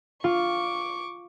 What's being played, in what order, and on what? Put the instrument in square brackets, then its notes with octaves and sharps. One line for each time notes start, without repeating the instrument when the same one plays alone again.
[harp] F4 [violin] C#6 D6